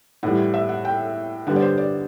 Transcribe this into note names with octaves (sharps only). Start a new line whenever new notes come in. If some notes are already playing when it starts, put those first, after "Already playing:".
A2 E3 G3 F#5
E5
F#5
G5
D3 G3 B3 F#5
D5
C5
D5